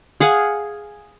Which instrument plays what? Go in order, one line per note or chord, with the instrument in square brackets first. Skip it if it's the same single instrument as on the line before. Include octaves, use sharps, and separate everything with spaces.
[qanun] G#4 F5 F#5